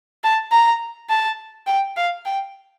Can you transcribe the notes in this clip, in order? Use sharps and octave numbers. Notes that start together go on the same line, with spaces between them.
A5
A#5
A5
G5
F5
G5